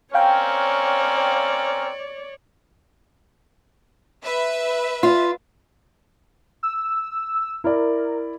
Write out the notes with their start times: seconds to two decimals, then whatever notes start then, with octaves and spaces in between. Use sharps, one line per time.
0.14 C4 C#4 A#4 C#5 D5 F5 G5
4.24 B4 E5
5.03 F4
6.63 E6
7.64 E4 A#4 D5